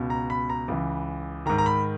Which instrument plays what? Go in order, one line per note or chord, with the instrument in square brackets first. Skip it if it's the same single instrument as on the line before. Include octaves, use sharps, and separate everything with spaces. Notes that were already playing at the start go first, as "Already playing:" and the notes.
Already playing: [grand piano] C#2 B2
A#5
B5
A#5
C#2 C#3 E3
D#3 A#5
G#2
A#5
B5